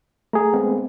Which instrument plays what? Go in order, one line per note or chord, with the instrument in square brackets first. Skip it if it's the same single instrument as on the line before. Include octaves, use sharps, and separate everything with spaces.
[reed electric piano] A3 G#4 [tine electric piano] A#5
[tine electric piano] G#3 B3 C4